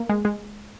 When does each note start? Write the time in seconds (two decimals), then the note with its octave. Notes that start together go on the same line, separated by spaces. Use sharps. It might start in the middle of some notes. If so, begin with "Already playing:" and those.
Already playing: A#3
0.09 G#3
0.25 G#3